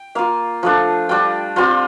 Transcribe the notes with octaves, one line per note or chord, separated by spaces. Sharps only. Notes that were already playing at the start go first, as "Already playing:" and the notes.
Already playing: G5
A#3 F4 F5
F3 A3 D4
G3 D4 F4 G5
G3 C4 F4 C6